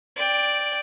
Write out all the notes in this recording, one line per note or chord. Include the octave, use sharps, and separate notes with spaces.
D5 G5